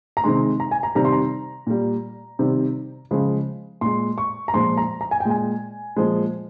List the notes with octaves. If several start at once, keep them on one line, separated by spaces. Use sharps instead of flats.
A#5
C3 D#3 G#3 C6
A#5
G#5
A#5
C3 D#3 G3 A#5
C6
A#5
A#2 G3
C3 D#3 G3
C#3 F3 G#3
A#2 G#3 C6
C#6
A#5
A#2 F3 G#3 C6
A#5
A#5
G#5
G5
A#2 G#3 G#5
A#2 F3 G#3